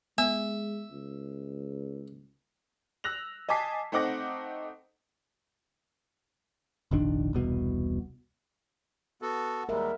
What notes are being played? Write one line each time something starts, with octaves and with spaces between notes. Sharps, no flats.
G#3 B3 E5
C#2
E6 F#6 A#6 F7
D#5 G#5 A5 D6 B6 C7
A3 C4 D#4 F#5 D6 A#6
F1 A#1 D#3 D4
E1 C2 B2
B3 F#4 A4
D#2 G3 G#3 A#4 E5 F#5